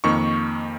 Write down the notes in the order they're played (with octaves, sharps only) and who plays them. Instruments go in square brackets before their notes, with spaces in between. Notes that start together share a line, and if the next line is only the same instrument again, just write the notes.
[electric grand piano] F2 D#3 A#3 C#6